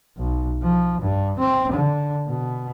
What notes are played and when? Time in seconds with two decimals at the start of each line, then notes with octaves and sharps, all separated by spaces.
0.17 B1
0.63 F3
1.01 G2
1.39 C4
1.72 D3
2.28 B2